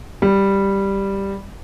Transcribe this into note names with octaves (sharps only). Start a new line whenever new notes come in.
G3